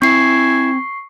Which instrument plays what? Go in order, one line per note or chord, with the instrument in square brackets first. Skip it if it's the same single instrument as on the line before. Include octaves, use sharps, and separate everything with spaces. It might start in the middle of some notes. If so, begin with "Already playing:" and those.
[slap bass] C4 [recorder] E4 [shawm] G#5 [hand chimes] C#6 C7